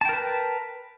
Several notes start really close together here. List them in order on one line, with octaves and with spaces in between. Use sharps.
A5 G5 A#4 B4